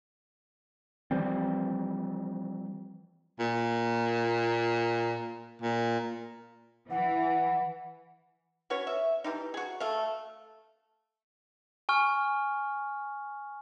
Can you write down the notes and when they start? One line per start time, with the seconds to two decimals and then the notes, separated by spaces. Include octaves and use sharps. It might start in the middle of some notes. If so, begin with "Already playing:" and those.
1.11 E3 F3 G3 C4
3.40 A#2
5.62 A#2
6.90 E3 F#5
8.70 C#4 F#4 B4 C#5
8.87 E5
9.24 E3 G3 D#4
9.54 F#4 G#4
9.80 A3 F5
11.89 G#5 C#6 F6